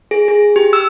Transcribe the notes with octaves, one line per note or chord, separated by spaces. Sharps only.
G#4
G#4
G4
E6